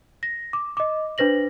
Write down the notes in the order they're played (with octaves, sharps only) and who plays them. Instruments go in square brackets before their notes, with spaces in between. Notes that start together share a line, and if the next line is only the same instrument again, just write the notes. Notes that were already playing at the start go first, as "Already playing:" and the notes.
[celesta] A#6
D6
D#5 D6
D4 B4 C5 A#6 F#7